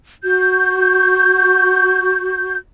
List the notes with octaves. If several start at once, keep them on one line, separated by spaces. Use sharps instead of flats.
F#4 G6